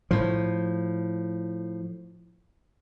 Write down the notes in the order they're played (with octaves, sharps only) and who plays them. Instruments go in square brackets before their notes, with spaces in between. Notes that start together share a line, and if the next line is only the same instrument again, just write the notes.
[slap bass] A2 F3